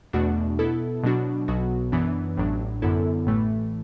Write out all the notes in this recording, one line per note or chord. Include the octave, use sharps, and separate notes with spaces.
E2 B2 A3 D4 F#4
B2 B3 E4 A4
B2 F#3 D4 F#4
B1 B2 F#3 B3 F#4
F#2 E3 B3 D4
A1 A2 F#3 D4
F#2 D3 B3 E4 A4
A1 A2 E3 A3